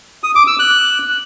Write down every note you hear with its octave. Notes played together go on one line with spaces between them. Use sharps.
D#6
D6
E6
F#6